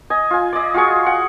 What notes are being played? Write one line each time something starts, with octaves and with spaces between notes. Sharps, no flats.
D#5 G#5
F4 G#5
D5 D#5
F4 F#4 G#4 C#6
F#5